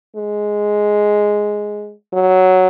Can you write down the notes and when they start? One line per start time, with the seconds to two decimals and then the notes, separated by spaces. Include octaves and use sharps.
0.16 G#3
2.13 F#3